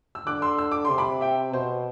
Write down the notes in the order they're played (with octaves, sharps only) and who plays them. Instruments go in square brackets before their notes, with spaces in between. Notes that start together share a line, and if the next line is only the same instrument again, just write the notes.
[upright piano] E6
[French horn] D3 [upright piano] D6 F#6
[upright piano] C6 E6
E6
D6
[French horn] C3 [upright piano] C6
[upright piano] B5 D6
E5 G5
[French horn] B2 [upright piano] C5